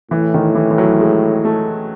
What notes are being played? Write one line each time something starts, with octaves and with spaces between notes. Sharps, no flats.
A2 E3
D#3
E3
E3
F#3
G#3
A3